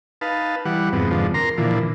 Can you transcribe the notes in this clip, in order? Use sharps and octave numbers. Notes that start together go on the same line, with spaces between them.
D#4 B4 F5 A5
E3 G3 F#5
F2 G#2 C3 B3
F2 G#2 D3 F3
A#4 A#5 C6
A#2 D3 E3 F3